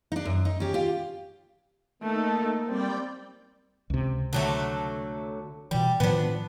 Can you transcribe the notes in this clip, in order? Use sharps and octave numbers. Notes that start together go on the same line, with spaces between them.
D4 D#4
F#2
D#4
C#4 G4
F4 G4
A3 A#3 D#4 A4
G3 C4 D5 G5
C#2 C3
D3 F#3 A3
B2 E3 G3
A2 D#3 F3 B3 D4